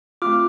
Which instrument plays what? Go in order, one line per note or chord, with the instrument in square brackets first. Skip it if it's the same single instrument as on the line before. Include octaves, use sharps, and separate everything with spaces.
[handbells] A3 C4 F4 D6 F6